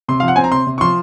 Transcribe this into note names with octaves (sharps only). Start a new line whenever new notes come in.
C3 C6
F3 F5
F#5
C4 G#5
A#5
C3 C6
C3
C#6
F3 C6